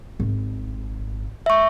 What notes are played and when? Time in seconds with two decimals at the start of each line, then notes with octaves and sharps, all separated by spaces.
0.20 G#1
1.46 E5 C#6